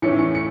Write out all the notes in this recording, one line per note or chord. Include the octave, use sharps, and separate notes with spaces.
A2 E3 A3 C#4 C#7
C#7
C#7